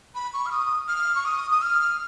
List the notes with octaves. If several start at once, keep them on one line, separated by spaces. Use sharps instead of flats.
B5
C#6
F6
D#6
F6
C#6
D#6
D#6
F6